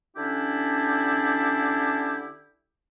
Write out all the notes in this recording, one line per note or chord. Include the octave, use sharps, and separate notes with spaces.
D3 C#4 D4 E4 G4